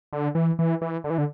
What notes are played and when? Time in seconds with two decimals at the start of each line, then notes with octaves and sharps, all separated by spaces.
0.13 D3
0.35 E3
0.59 E3
0.81 E3
1.04 D3
1.10 E3
1.18 D3